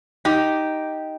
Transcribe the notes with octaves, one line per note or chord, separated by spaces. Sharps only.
D#4 G4